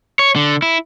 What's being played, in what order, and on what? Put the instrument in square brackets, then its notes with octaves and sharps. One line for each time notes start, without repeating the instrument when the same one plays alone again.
[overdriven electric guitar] C#5
D3
E4